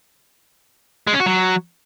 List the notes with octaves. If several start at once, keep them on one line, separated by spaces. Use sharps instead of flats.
G#3
C#4
F#4
F#3